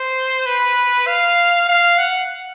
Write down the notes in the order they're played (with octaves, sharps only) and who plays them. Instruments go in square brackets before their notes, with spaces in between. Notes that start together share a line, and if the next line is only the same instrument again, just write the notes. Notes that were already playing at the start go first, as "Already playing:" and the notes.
Already playing: [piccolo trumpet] C5
B4
F5
F5
F#5